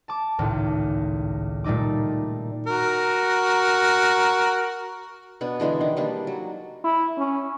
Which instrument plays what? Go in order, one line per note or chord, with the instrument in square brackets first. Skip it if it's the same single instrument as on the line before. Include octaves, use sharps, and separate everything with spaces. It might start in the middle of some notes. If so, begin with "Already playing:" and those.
[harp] A5 D6
G#1 C#2 A2
A#2 G3 A3 D#4 D6
[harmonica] F#4 A#4
[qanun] B2 B3 D4
D3 E3 G#3 D4
D#3
G3 A#3 D4
F#3
[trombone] E4
C#4